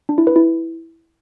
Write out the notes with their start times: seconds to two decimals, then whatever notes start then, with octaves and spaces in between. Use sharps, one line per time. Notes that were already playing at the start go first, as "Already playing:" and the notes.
0.09 D4
0.18 E4
0.27 B4
0.36 E4